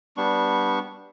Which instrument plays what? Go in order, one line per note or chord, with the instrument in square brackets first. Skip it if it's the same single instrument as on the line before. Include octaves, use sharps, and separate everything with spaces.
[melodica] G3 B3 D4 C#6